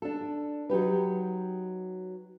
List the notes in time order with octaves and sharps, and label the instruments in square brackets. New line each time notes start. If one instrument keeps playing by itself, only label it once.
[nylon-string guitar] D4 A4
F#3 D#4 G4 B4